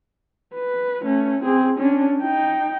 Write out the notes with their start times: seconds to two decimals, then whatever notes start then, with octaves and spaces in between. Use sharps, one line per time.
0.54 B4
1.02 A3 C#4
1.43 C4 G#4
1.79 C#4 D4
2.21 D#4 G5